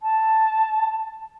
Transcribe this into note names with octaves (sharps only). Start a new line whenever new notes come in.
A5